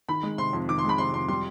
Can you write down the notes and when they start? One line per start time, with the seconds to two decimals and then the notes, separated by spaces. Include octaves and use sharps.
0.09 D#3 B5
0.23 G#3
0.38 C3 C6
0.53 F2
0.69 D#3 D6
0.78 C6
0.84 G#3 B5
0.98 C3 C6
1.13 F2 C6
1.28 G3 C6